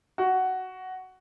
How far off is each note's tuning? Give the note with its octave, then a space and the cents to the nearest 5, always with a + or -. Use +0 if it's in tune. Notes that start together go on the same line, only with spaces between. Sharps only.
F#4 +10